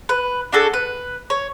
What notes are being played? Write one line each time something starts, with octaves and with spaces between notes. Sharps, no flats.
B4
D4 F#4 G#4 A4
B4
C#5